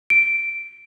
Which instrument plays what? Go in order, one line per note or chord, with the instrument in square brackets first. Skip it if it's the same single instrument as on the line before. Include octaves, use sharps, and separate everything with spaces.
[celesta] D7